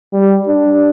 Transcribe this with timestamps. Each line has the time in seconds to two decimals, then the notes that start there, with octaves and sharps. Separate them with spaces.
0.13 G3
0.47 D4